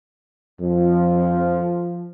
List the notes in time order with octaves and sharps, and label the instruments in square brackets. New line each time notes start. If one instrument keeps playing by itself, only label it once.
[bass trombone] F2 [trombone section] F3